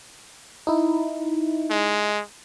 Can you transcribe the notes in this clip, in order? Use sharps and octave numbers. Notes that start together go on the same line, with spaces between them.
D#4 E4
G#3